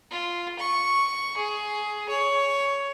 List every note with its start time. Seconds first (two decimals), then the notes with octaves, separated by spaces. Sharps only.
0.11 F4
0.59 C#6
1.37 G#4
2.09 C#5